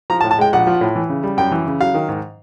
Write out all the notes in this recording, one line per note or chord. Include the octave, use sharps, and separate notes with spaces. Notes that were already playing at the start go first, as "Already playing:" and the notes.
F3 A#5
A5
A2
A5
G#3 G5
A#1 F#5
F3
A2
E3
C#3
G3
F#2 G5
E3
C#3
F#3 F5
D#3
G#2